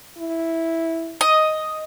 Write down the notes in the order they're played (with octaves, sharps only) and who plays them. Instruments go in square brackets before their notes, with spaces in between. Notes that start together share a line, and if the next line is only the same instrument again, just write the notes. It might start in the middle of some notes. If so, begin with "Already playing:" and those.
[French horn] E4
[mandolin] D#5